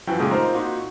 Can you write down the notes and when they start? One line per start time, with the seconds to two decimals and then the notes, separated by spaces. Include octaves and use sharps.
0.07 F#2 E3 F3 F#4 G5 G6
0.19 A#2 C#3 G#3 A3
0.31 C4 D#4 F4 G4 A#4 C5
0.53 A#2 D#4 F#4